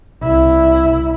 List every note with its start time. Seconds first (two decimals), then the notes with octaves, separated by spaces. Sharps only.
0.23 C2 E4